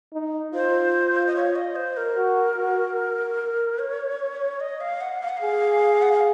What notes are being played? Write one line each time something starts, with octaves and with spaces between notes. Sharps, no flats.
D#4
F4 C5
D#5
C#5
D#5
C5
A#4
F#4
F#4
C#5
D#5
F5
F#5
F5
F#5
G#4 F5
F#5
F5